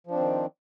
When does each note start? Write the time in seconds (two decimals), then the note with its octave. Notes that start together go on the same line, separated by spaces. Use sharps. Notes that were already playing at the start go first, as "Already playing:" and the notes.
0.07 F3
0.11 D4
0.15 C4
0.19 D#3